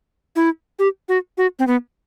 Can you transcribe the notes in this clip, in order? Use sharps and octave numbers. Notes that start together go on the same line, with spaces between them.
E4
G4
F#4
F#4
C4
B3